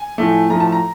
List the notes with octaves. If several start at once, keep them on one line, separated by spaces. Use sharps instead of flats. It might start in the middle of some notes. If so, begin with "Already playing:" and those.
Already playing: G#5
A2 F3 A3
A2 F3 A3 A#5
A5
A#5